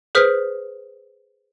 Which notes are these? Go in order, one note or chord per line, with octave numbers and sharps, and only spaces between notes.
G#4 B4 C5 D#6 F6 B6